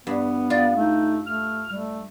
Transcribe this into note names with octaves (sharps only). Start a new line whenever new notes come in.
G2 B3
F4 D5
A3 D#4
A3 F6
G3 A3